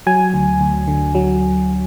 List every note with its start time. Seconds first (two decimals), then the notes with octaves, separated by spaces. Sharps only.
0.07 F#3 G#5
0.34 D2
0.61 D2
0.88 D3
1.15 F#3